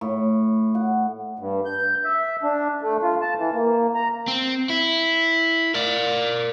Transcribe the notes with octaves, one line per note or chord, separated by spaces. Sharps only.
A2
F#5
G2
G6
E5
D4
A3
F4
A5
E3
A#3
A#5
C4
E4
A#4 D5